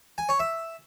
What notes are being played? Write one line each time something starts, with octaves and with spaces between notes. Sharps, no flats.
G#5
C#5
E5